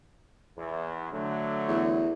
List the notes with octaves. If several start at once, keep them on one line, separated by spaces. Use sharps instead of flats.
E2
D3 F#3 A3
E2